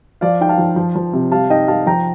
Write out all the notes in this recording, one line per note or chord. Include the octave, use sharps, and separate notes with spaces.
F3 D5 F5
D#4 G5
F5 A5
F3
F3
F3
C3
G3 F5 A5
D#4 D#5 G5
G3 F5 A5
F3 G5 A#5